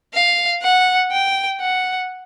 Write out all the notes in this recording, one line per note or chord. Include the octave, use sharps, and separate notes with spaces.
F5
F#5
G5
F#5